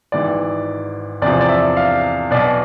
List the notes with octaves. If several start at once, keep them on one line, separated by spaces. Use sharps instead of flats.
G#1 G#2 E3 D5
E2 C3 F3 D5
D5
E5
F5
B1 B2 D5